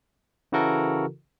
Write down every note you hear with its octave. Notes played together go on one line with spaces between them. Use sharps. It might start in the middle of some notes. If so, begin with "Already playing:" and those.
C#3 E3 E4 F#4 A4 A#4